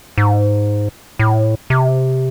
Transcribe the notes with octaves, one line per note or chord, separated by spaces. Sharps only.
G#2
A2
C3